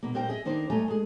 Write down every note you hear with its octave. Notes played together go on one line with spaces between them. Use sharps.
B2 A#3
A#2 C4 A#4 C5 D#5 G5
G#4 D#5 E5
D#3 A#3 D4 D#4 A#4 C5
G2 A3 C#5 D#5 G#5 A#5
G#3 G#4